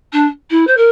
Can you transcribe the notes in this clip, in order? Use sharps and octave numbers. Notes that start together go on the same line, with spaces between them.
D4
E4
C5
A#4